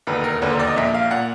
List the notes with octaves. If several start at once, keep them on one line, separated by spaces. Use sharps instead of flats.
E1 D#2 D3 B4
A#4
E1 D#2 D3 B4
C5
D5
D#5
A#1 A#2 E5
F5
A#2 F#5